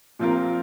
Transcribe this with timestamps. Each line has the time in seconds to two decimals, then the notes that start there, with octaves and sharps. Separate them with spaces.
0.19 A#2 F3 C4 F4 A#4